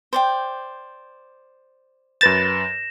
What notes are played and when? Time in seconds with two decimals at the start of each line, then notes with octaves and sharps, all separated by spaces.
0.13 C5 D5 G5
2.21 F#2 B4 G6 A6 A#6 E7